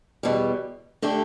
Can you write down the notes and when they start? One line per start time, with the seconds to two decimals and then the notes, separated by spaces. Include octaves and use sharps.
0.23 E2 B2 G3
1.02 D3 A3 D4 G4